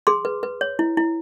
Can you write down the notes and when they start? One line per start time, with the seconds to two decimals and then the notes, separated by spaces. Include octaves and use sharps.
0.07 G#4 C6 D6
0.25 B4
0.43 B4
0.61 C#5
0.79 E4
0.97 E4